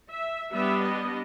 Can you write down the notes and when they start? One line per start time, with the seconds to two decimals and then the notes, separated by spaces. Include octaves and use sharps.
0.10 E5
0.53 G3 B3 D4 E5
0.82 D#5